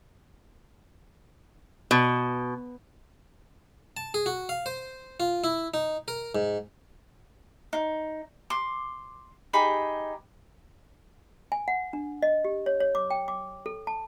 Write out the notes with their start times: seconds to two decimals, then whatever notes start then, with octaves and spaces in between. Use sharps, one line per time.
1.91 B2
3.97 A5
4.14 G#4
4.26 F#4
4.49 F5
4.66 C5
5.20 F4
5.44 E4
5.74 D#4
6.08 A#4
6.35 G#2
7.73 D#4
8.50 C6 D6
9.53 D#4 G4 G#4 B5
11.52 G#5
11.68 F#5
11.93 D4
12.22 D#5
12.44 G4
12.66 C#5
12.80 C#5
12.95 D6
13.10 G5
13.28 D6
13.66 A4
13.87 A5